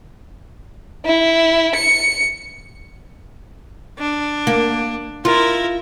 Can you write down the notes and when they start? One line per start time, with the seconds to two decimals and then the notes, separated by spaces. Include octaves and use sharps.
1.06 E4
1.75 C#7
3.99 D4
4.47 A#3
5.25 E4 F4 A#4